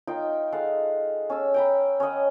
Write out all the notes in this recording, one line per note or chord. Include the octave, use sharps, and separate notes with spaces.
D#4 F4 G5 C#6
G#3 A4 F5 F#5
C#4 A5 E6
G5 A#5 B5
C#4 C#5 D#5 F#5